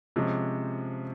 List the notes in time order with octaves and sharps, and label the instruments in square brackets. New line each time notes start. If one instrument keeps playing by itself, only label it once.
[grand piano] C3 F3 G#3 C#4